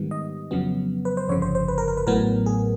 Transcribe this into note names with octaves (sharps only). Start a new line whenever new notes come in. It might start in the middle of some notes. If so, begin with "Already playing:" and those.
Already playing: G#2 D#3 G3 B3
D#5
F2 C#3 F#3 B3
B4
C5
G1 F2 C#3 C#5
C5
C5
B4
A#4
A#4
B4
A1 A2 F#3 B3 A#4
G#4